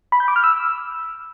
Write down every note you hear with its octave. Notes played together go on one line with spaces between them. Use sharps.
B5
G6
D6
F6
E6